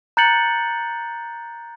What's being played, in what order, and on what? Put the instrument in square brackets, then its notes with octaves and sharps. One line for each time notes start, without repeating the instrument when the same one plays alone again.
[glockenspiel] A#5 F#6 G6 A6 C#7 F#7